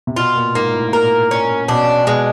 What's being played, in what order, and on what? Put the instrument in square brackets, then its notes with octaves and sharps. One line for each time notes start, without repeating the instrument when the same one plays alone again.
[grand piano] C3
[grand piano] B2 [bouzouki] F4
[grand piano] A#2
[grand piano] G#2 [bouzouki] A#3
[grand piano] A2
[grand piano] A#2 [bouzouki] A#4
[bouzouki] C#4
[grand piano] B2 [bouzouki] D4
[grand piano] B2 [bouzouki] G#3